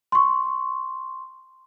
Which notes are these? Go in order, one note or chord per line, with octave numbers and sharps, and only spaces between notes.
C6 C#6